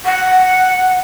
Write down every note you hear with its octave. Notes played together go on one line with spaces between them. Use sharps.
F#5